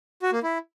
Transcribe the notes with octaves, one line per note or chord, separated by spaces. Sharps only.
F#4
A#3
E4